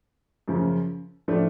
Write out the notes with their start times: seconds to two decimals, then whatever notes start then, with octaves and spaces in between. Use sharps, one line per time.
0.48 F#2 C#3 F3
1.28 A2 F3 A3 D4